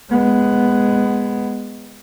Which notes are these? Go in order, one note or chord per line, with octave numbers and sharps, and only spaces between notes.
G#3 B3